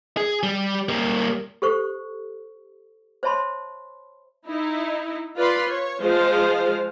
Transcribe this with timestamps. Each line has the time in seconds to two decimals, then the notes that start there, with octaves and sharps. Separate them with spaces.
0.17 G#4
0.43 G3
0.89 G3 A#3
1.62 G4 A4 C5 C#6
3.23 C5 C#5 E5 A5 B5 C6
4.48 D#4 E4
5.36 F4 B4 D5 B5 C6
5.69 C#5
6.02 F3 G#3 F4 C5 F5